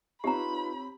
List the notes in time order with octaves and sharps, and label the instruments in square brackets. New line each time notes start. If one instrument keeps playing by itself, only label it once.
[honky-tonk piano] C4 C#5 [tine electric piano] D#4 F4 B4 [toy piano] G4 A#5 [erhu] B5